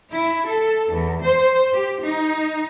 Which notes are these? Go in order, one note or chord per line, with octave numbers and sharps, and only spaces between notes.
E4
A4
E2
C5
G4
D#4